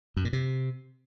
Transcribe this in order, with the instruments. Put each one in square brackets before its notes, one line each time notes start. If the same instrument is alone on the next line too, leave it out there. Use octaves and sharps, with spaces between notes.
[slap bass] F#2
A#2
C3